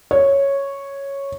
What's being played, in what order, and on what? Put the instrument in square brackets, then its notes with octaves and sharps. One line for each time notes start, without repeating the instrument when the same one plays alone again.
[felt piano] C#5